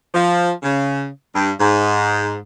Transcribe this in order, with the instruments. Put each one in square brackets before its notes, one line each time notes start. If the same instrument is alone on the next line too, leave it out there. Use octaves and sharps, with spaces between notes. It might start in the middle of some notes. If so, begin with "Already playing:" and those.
[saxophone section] F3
C#3
G2
G#2